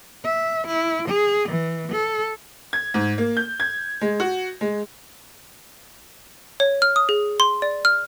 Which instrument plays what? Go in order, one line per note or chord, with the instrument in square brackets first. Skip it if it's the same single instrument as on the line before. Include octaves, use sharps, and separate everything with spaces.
[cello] E5
E4
G#4
E3
A4
[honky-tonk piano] G#6
G#2
A#3
G6
G#6
G#3
F#4
G#3
[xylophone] C#5
F6
D#6
G#4
C6
D5
F6